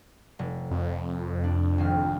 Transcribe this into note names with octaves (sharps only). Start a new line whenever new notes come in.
F1
F2
D4
G#1 C4 F6